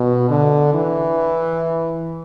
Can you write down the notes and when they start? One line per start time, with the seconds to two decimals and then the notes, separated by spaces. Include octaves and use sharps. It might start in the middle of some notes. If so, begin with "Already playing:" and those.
Already playing: B2
0.30 D3
0.74 E3